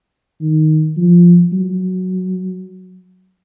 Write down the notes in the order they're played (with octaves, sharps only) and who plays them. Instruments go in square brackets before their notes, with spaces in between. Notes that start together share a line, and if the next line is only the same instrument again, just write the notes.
[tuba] D#3
F3
F#3